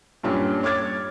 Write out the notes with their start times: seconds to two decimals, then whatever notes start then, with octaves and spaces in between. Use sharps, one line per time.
0.23 G2 A#2 G3 C#4 D4
0.63 C#5 D6 F6 G#6 A6